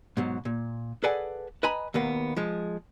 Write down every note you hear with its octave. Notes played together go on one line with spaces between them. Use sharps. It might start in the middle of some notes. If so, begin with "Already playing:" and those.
G#2 B2 F#3
A#2
G#4 A4 B4 D5 F#5 G#5
B4 D#5 G#5 A#5 B5
D#2 B2 A#3 B3
F3 G#3